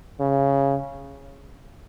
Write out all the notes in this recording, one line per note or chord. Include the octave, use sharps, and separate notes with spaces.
C#3